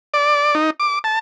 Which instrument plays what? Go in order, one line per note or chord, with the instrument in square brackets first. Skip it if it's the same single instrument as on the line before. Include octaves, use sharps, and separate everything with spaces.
[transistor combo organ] D5
D#4
D6
A5